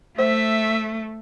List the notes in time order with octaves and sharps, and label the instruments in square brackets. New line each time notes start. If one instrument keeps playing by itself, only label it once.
[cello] A3 [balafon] C5 [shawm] E5